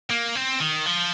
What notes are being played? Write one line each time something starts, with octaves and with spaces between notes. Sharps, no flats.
A#3
C4
D#3
F3